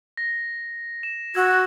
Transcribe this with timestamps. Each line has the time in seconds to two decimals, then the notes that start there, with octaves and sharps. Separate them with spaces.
0.17 A#6
1.03 E7
1.35 F#4 E6 G#6